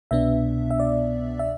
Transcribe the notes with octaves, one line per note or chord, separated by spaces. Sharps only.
C2 B2 B3 D4 E5
E5
D5
E5